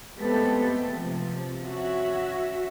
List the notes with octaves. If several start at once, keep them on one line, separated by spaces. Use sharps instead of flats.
G#3 A3 B3 C4 G4 A4
C3 F3
C#4 F#4 E5